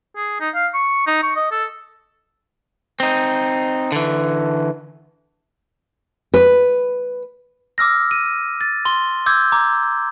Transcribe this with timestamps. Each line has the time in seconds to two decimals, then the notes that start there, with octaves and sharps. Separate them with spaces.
0.16 G#4
0.40 D#4
0.55 F5
0.74 C#6
1.07 D#4
1.23 C#6
1.36 D#5
1.52 A4
3.00 C4 D#4
3.92 D3 E3
6.34 B4
7.78 D6 E6 F6 A#6
8.11 D#7
8.61 A6
8.85 C6 G7
9.26 D6 E6 G6 G#6
9.52 A#5 D6